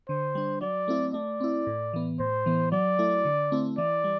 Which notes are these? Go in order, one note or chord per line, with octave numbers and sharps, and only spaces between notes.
D3 C5
G3 D4
F#3 D5
A3 C4 E4
A3 D5
C4 E4
A2
E3 B3
A2 C5
E3 B3
F#3 D5
A3 E4
D3
A3 C4 E4
E3 D5
G3